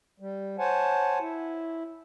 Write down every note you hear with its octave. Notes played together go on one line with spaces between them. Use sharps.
G3
C5 C#5 F#5 G#5 A5
E4